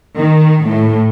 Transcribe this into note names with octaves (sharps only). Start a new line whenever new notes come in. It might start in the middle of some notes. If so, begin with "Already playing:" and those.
D#3
A2